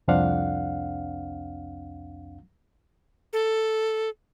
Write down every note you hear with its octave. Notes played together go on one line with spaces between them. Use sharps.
C2 F2 C4 D4 F5 F#5
A4